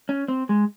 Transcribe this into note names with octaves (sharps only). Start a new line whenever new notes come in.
C#4
C4
G#3